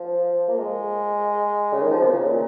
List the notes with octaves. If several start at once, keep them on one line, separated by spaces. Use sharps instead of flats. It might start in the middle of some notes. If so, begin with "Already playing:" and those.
Already playing: F3
A#3
G#3
C#3
D#3
F3
B2
C#3
A#2